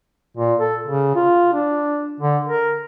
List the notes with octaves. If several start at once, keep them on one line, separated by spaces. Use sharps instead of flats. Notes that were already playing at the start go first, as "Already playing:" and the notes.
A#2
A4
C#3
F4
D4
D3
A#4